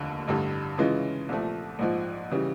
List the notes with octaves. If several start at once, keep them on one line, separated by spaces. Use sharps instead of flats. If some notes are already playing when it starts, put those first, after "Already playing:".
Already playing: F1 D#2 D3
A1 G2 D3 G3
C#3 E3 G#3 C#4 F4
C2 A#2 F3 A3
A#1 G#2 F3
C#3 E3 G3